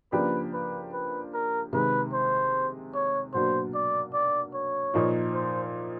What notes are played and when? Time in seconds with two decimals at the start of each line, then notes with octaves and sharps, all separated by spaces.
0.12 C#3 F3 A#3 D4 G4 B4
0.53 B4
0.93 B4
1.34 A#4
1.73 C3 D#3 G#3 B4
2.13 C5
2.94 C#5
3.33 B2 F#3 A#3 D4 C5
3.74 D5
4.13 D5
4.54 C#5
4.94 A#2 F3 A#3 D#4
5.34 C5